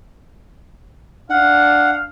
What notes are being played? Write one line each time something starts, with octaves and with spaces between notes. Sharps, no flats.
D4 F5 F#5